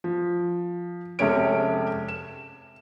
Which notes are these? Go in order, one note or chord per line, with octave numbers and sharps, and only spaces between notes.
F3
F1 C3 G#3 C#4 C#5 D7
E7